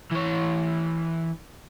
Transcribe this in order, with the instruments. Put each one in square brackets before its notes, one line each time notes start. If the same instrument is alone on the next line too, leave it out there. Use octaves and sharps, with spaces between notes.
[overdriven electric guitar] E3 C#5